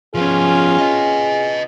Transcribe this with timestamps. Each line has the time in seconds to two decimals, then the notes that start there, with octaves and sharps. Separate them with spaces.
0.15 F3 B3 C#4 F4 G#4
0.78 B4 D#5